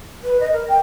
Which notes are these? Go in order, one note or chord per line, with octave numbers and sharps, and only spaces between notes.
B4
D#5
A#4
G5